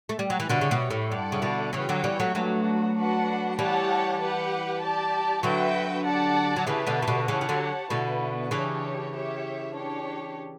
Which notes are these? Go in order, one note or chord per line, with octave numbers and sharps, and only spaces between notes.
A3
G3
F#3
E3
B2 D3 E4 G4 C#5
C#3
B2
A2
G2 E4 A4 D5 F#5
C#3
B2 D3
C#3 E3 B3 F#4 C#5 G5
D3 F#3
E3 G3
F#3 A3
F#3 A3 B3 D4 F#4
D4 F#4 B4 F#5
E3 G3 G4 C#5 F#5 A5
G4 B4 F#5
G4 D5 A5
D3 F#3 F#4 B4 E5 G5
G4 D5 F#5 A5
F#3
C#3 E3 G4 B4 E5 A5
B2 D3
E3
B2 D3
C#3 E3 G4 C#5 F#5 A5
E3
D3 F#3
B2 D3 B3 E4 B4
C#3 E3 D4 G4 C#5
G4 C#5 E5
D4 G4 C#5